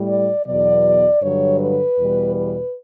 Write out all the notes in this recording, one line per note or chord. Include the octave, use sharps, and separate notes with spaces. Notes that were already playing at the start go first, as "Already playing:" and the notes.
Already playing: A2 G3
D5
E2 B2 F#3 D5
G2 D3 F#3 C#5
B4
E2 B2 G3
B4